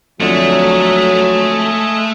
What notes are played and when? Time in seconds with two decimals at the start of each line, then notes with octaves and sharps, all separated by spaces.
0.20 F2 D3 F#3 G#3 A3